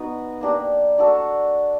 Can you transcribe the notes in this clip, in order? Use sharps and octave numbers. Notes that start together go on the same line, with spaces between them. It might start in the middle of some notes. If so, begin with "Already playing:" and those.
Already playing: B3 D#4 F#4 B4
A#3 D4 G4
A3 D4 F#4 A4